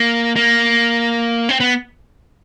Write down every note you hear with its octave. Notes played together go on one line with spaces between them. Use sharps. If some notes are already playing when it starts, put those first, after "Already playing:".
Already playing: A#3
A#3
C4
B3